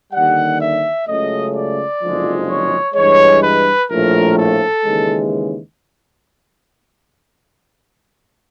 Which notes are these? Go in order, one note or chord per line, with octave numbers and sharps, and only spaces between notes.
D#2 D3 G3 F#5
E5
C#2 C#3 F#3 A3 D#5
D5
F#1 F2 D3 F3 G#3
C#5
G2 E3 G#3 C#5
B4
A#1 A2 F3 A3 A#4
A4
D#2 C#3 E3 G#3